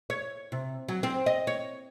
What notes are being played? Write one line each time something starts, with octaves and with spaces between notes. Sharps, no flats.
C#5
C3
F#3
C4
D#5
C#5